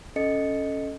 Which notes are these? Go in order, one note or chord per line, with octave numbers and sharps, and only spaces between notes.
C#4 A4 D#5 A6 C#7